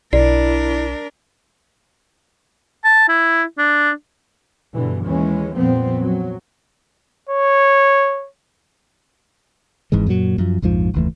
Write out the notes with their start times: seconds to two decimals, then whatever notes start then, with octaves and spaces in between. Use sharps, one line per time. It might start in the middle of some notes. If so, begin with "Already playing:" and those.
0.13 B1 D4 E4 A#4 D5
2.85 A5
3.08 E4
3.58 D4
4.74 G2 B2 D3 E3
5.06 D#2 E3 G#3 C#4
5.56 F2 A#2 F3 G3 B3 C4
6.00 F#3
7.29 C#5
9.92 G#1 G#2 E3 G#3
10.07 F#2 A#2 C#3 F#3
10.38 F#2 F3
10.62 A#1 F2 G#2 F3
10.94 F#1 D#2 E3 A3